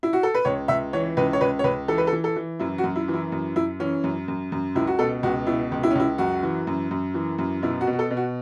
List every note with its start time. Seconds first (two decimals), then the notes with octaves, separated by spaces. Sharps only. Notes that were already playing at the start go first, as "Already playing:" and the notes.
0.03 E4
0.13 F#4
0.23 A4
0.35 B4
0.45 C#2 C#5
0.68 C#2 E5
0.93 E3 C#5
1.17 C#2 B4
1.33 C#5
1.41 C#2 B4
1.59 C#5
1.64 C#2 B4
1.88 E3 A4
1.98 B4
2.07 A4
2.13 E3
2.24 A4
2.36 E3
2.60 F#2 E4
2.78 F#4
2.84 F#2
2.96 E4
3.08 E3
3.14 E4
3.32 F#2
3.56 F#2 E4
3.80 E3 C#4
4.04 F#2
4.28 F#2
4.52 F#2
4.75 C#2 E4
4.87 F#4
4.99 B2 A4
5.23 C#2 F#4
5.47 B2 E4
5.72 C#2
5.83 E4
5.91 C#4
5.95 C#2 E4
6.18 F#2 F#4
6.43 E3
6.67 F#2
6.91 F#2
7.14 E3
7.38 F#2
7.62 B2 E4
7.81 F#4
7.87 B2
7.93 F#4
7.99 A4
8.10 B2
8.17 F#4